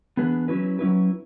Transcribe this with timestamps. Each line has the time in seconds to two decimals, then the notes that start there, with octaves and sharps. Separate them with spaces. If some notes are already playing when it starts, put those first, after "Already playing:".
0.17 E3 B3 D4 G#4 B4
0.48 F#3 C#4 E4 B4
0.79 F#3 C#4 E4 B4